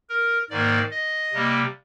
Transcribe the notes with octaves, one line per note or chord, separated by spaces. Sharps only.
A#4
G#2 D#3 A#3 D5
D#5
C3 G3 A#3